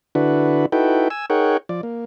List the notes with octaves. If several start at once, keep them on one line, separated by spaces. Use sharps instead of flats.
D3 D4 E4 F#4 B4
D#4 E4 F#4 A4 B4 G5
G#5 E6
D#4 G#4 A#4 C#5 F#5 G5
F3 D5
A#3